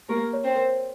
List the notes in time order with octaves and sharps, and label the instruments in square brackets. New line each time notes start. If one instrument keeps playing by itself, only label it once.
[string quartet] A#3 A#4 [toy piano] G4
[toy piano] C#5
[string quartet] C4 C5
[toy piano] A#4